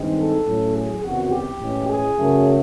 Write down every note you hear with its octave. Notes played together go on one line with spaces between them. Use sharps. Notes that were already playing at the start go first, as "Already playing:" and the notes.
Already playing: G2 D#3 G#3 C4 D#4
A4
A2 F#3 A3 C#4
G#4
F#1 E2 C3 E3 F#4
G4
A2 E3 G#3 C#4
G#4
F#2 C#3 F#3 A3